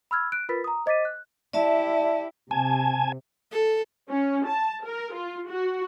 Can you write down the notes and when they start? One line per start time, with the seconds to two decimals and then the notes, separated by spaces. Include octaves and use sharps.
0.11 B5 E6 F6 G#6
0.32 F#6 D7
0.49 F4 A#4 B4 B5 A6 B6
0.64 A#5 D#6
0.86 C5 D#5 D6 A6 B6 D#7
1.05 F#6
1.53 E4 G4 D5 E5 A5
2.51 C3 G#5 A5 G#6
3.52 A4
4.09 C#4
4.47 A5
4.86 A#4
5.15 F4
5.49 F#4